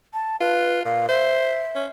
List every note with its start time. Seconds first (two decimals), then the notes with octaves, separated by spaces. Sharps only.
0.14 A5
0.40 F4 B4
0.85 A#2 F5
1.09 C5 E5
1.75 C#4